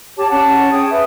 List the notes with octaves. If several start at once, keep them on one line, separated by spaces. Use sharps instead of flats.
G4 C#5 A5 D6
C#4 F#5 A5
G#4 G5 D#6
B4 E5